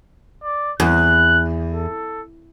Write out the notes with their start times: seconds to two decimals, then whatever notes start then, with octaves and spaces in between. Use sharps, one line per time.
0.44 D5
0.80 E2 F#6
1.74 A4